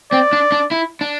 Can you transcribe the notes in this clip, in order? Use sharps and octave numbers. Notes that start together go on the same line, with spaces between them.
C4 D5
D4
D4
E4
D4